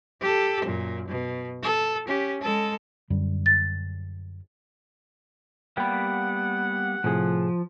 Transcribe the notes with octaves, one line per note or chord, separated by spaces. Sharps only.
G4 A4
F#2 A#2
B2
A4
C#4 G4
G#3 A4
F#2 D3 G3
A6
G3 A#3 B3 F#5 G5 B5
A2 C3 F3 G#4